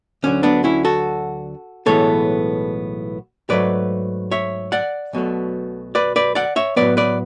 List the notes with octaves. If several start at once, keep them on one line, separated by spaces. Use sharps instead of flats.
D2 D3 F#3 C#4
B3 D4
C#4 E4
F#4 A4
B1 A2 E3 G#3 B3 A4 C#5
G#2 F#3 A3 B4 D5
C#5 E5
D5 F#5
B1 B2 F#3 A3
B4 D5
B4 D5
D5 F#5
C#5 E5
A2 F#3 B3 B4 D5
B4 D5